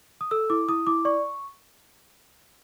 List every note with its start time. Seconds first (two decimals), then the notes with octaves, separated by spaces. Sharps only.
0.21 D#6
0.31 A4 E6
0.50 E4 D6
0.69 E4 D#6
0.87 E4 D6
1.05 D5 C#6